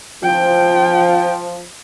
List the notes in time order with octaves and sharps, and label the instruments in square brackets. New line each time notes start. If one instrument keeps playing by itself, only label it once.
[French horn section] F3 [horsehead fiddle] G5